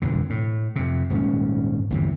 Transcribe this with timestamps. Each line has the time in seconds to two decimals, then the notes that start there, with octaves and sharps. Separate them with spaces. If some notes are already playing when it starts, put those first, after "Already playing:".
0.02 E1 F2 D3
0.30 A2
0.76 F2 C3
1.10 D#1 G#2 G#3 C#4
1.90 G1 E2 C3